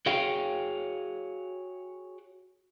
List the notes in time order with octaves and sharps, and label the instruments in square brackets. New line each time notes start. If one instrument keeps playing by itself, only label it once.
[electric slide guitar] F#4 G#4 C#5 F5 G5